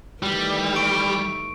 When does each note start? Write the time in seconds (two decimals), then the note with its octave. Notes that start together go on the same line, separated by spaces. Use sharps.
0.23 D#3 E3 G3 A3
0.76 C#6 D7